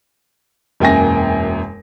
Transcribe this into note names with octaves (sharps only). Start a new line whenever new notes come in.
E1 F#2 A#3 G5 G#5 A#6